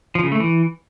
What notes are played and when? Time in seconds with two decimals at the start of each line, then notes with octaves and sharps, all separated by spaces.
0.15 F3
0.23 C#3
0.32 A3
0.40 E3